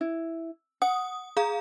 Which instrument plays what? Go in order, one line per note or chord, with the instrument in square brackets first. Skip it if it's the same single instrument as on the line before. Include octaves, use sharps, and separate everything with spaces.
[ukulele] E4
[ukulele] F#5 [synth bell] D#6
[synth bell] G#4 F5 A#5